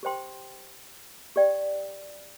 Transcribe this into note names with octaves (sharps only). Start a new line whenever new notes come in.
G4 C5 G5 C6
G4 D5 G5